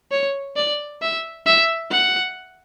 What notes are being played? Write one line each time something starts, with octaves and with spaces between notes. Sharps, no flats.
C#5
D5
E5
E5
F#5